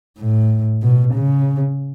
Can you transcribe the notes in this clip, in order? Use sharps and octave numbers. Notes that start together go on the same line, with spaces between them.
A2
B2
C#3